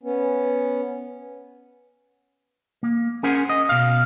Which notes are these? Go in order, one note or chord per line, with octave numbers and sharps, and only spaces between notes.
B3 C#4
A#3
C#4 G#4 A#4 C5 F#5 G#5
D#5
B2 F5